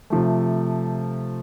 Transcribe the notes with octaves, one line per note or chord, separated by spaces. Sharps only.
C3 F3 A3